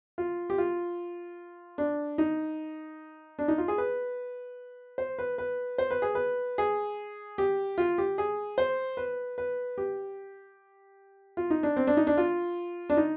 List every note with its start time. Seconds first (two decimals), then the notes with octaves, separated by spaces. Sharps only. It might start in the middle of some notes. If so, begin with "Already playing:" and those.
0.18 F4
0.50 G4
0.58 F4
1.78 D4
2.18 D#4
3.39 D4
3.48 D#4
3.58 F4
3.68 G#4
3.78 B4
4.98 C5
5.19 B4
5.38 B4
5.78 C5
5.91 B4
6.02 G#4
6.15 B4
6.58 G#4
7.38 G4
7.78 F4
7.98 G4
8.18 G#4
8.58 C5
8.97 B4
9.38 B4
9.78 G4
11.37 F4
11.50 D#4
11.63 D4
11.77 C4
11.87 D4
11.97 D#4
12.07 D4
12.17 F4
12.90 D4
12.97 D#4